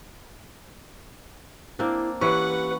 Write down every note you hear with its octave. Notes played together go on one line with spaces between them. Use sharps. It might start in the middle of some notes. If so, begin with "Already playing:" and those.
A#3 C4 D4 E4
E3 C#4 G4 B4 F#5 C#6